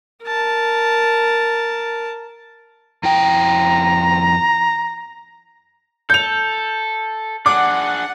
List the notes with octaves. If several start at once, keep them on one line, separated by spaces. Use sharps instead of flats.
A#4 A5
F2 E4 G5 A#5
A4 G6 F7
D4 G#4 F#5 D6